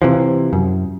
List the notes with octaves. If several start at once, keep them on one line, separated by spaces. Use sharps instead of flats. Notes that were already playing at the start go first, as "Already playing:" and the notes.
C3 E3 F3
F#2